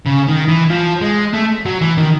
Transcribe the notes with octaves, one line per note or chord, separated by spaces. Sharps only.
C#3
D#3
E3
F3
G#3
A3
F#3
E3
D#3